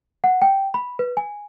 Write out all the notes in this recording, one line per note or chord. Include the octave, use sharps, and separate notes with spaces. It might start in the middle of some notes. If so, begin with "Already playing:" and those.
F#5
G5
B5
B4
G#5